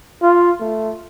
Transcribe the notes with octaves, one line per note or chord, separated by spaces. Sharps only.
F4
A3